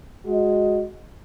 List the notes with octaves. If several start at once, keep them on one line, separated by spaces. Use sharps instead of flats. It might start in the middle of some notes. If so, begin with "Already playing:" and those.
G#3 F#4 D#5